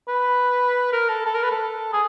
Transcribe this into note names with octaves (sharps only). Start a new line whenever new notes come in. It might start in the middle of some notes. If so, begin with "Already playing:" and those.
B4
A#4
A4
A4
A#4
B4
A4
G#4